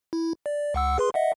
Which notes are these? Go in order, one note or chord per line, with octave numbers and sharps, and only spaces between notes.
E4
D5
C#2 F#5 E6
G#4 B4 C6
D#5 E5 F#5